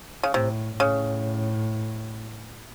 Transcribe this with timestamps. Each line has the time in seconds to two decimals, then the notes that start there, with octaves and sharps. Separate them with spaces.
0.23 C#3
0.33 A2 C3
0.79 A2 C#3